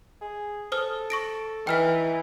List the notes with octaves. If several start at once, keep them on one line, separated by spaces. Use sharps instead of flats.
G#4
A4 C5 D#6 F6
C#6 A#6 D7
E3 D#4 G5 F6 B6